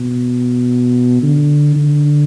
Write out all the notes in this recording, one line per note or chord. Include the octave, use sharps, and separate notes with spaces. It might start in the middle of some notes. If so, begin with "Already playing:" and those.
Already playing: B2
D3
D3